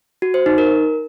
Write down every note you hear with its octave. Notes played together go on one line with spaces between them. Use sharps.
F#4
C5
D#4
A#4